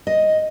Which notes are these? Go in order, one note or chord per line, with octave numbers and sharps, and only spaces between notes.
D#5